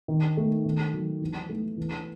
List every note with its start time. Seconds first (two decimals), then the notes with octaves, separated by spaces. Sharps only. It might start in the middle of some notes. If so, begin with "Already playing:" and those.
0.08 D#3
0.37 A3
0.65 D#3
0.94 F#3
1.21 E3
1.49 A3
1.78 E3